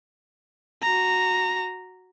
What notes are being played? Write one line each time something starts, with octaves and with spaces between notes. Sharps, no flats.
F#4 A#5